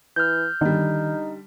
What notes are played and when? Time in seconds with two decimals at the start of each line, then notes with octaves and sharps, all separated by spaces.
0.16 E3 F6 G6
0.61 D3 D#3 G3 D#4